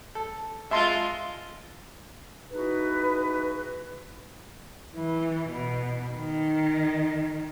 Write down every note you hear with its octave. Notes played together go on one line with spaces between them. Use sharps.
A4
G#3 F4 E5 A5 C6
D#4 E4 F#4 G#4 B4
E3
B2
D#3